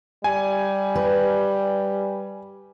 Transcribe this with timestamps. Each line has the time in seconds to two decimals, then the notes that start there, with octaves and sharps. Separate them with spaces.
0.24 G3 G#5
0.95 B4